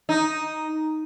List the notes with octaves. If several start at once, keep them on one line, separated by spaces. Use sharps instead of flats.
D#4